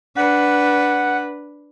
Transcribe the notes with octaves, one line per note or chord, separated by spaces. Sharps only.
D4 B4 F#5